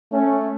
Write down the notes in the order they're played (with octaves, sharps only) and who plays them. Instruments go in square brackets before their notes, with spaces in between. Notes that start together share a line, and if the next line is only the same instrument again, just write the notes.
[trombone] A3 [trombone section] C#4